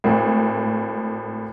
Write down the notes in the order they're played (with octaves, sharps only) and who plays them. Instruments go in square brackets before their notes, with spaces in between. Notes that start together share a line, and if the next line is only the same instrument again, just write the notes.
[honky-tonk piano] G#1 A2